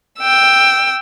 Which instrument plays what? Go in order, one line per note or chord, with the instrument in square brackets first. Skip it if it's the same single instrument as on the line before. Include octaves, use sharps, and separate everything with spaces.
[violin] G5 E6